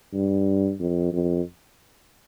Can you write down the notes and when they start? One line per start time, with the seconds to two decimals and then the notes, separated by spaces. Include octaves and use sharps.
0.13 G2
0.80 F2
1.13 F2